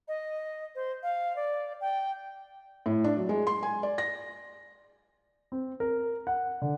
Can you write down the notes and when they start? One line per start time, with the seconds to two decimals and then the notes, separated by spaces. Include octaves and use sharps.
0.08 D#5
0.75 C5
1.03 F5
1.36 D5
1.81 G5
2.86 A2
3.04 D4
3.17 F#3
3.29 G#3
3.47 C6
3.63 G#5
3.83 D5
3.98 A#6
5.52 C4
5.80 A#4
6.27 F#5
6.62 D3